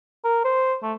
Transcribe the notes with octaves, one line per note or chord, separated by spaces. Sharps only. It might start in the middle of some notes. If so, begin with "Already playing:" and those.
A#4
C5
A3